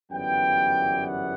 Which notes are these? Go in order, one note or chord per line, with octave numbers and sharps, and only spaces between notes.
G1 F#2 E3 G3 B3 G5
F#5